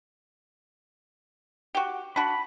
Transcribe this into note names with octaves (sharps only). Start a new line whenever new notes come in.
F#4 G4
D4 F#4 B5